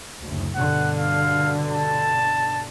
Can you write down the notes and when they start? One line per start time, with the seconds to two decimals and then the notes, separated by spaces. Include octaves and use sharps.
0.23 F#1 D2
0.55 G2 B2 D3 F#5
0.98 F5
1.71 A5